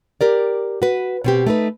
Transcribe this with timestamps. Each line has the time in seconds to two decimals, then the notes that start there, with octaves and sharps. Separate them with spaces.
0.21 G4 A#4 D5
0.82 F#4 B4
1.24 B2 C4 G4
1.46 A3 D#4 B4